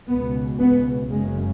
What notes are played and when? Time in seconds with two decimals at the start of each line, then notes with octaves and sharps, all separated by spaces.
0.08 C#2 B2 B3
0.59 B3
1.09 F#1 F#2 C#3 G#3